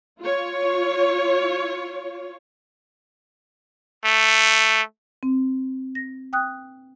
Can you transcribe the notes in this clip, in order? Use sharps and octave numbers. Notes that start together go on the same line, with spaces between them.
F4 C#5
A3
C4
A#6
G5 D#6 F#6